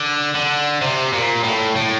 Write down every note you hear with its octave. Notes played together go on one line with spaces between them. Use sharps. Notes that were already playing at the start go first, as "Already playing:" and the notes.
Already playing: D3
D3
C3
A#2
A2
A2